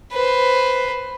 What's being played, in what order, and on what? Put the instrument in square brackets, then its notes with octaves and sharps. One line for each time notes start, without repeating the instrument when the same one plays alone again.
[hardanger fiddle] B4 C5